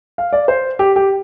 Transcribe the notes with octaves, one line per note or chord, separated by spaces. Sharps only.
F5
D5
C5
G4
G4